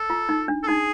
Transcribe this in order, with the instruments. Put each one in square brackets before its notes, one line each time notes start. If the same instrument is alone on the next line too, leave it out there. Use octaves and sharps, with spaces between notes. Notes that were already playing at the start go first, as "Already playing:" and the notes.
Already playing: [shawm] A4
[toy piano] F4
D#4
D4
[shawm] A4
[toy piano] D#4 [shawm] G#4